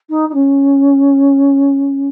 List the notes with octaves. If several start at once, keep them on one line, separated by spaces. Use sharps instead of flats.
D#4
D#4
C#4